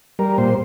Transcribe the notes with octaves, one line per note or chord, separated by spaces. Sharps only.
G3 A#4
A#2 C5